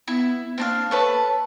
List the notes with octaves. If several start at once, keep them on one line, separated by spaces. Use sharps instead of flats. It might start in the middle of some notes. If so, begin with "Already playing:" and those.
B3 E4
A#3 C4 D4 F5
A3 B4 C#5 A5